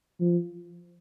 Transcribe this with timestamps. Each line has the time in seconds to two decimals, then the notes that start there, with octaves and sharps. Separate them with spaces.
0.20 F3